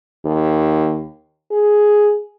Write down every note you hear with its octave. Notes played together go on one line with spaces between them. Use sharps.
D#2
G#4